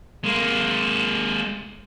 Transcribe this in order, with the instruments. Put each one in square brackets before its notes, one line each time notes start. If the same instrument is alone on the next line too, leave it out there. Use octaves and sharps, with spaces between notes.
[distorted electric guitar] G#3 A#3